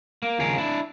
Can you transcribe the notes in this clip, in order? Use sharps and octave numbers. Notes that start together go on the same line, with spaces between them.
A#3
D#2 C#3 F3 G#4 A#4 C#5
D4 E4